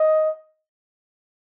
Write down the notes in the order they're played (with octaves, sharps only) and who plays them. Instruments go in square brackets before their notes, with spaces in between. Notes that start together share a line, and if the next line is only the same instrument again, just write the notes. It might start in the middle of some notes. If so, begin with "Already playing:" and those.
Already playing: [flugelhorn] D#5